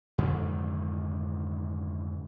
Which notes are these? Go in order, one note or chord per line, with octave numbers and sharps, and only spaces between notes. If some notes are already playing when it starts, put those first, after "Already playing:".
F2 G#2 D3 D#3